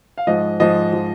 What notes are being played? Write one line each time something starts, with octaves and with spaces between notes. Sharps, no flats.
F5
G#2 F3 D#5
G#2 F3 D#5
F3